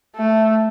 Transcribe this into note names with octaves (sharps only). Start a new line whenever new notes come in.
A3